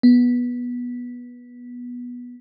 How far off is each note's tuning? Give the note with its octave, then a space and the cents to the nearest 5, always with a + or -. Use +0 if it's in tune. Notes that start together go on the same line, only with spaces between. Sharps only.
B3 -15